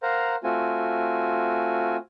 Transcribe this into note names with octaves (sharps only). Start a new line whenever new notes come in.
A#4 C5 F5 F#5 A#5
A3 C4 F4 F#4 G#5